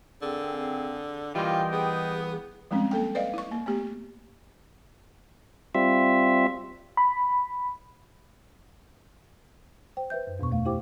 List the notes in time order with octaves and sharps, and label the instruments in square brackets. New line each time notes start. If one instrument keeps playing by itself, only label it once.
[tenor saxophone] D3 [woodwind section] A#3 C4 G#4
[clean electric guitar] E3 G3 A#3 [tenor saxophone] F4 [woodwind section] G4 D#5 G5 [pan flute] C6
[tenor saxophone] B3 [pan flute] G#4
[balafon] F3 G3 G#3 C4 C#4
A#3 A4 G5
B4 D5 D#5 F5
E4 C#6
A#3
A3 B3 G4
[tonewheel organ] G3 C4 F4 E5
[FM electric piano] B5
[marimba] C5 G5
B4 C5 E5 G6
F#2
E2 B2 B3 C#6
A3 F5
E4 G4 C5 G5 D6